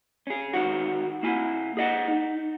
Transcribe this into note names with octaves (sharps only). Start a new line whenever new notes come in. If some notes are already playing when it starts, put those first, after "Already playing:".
C#4 G#4
G#2 D#3 F#4
A#3 E4 G#5
G#4 D#5 F#5
D#4